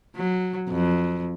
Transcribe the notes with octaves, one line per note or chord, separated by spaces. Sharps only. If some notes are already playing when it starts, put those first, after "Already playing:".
F#3
F2